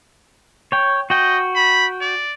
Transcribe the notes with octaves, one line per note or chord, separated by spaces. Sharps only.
C#5 G5
F#4 D#5 G5
B5
D5